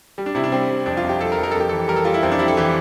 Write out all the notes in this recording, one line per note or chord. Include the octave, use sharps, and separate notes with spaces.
G3
D4
C3 E4
D4
G3 C4
G3
F2 D4
F4
F2
G4
G3 A4
A#4
F2
A#4
F2 A4
G4
E3 A4
G3 A#4
A4
G3 F4
E4
F2 C4
D4
G3 E4
A4
E3 G4